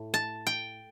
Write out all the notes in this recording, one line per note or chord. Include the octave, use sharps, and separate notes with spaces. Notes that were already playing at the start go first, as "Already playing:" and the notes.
Already playing: A2
A5
G5